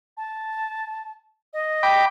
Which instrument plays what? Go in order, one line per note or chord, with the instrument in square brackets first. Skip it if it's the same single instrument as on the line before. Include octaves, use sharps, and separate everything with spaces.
[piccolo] A5
D#5
[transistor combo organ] G5 B5 D6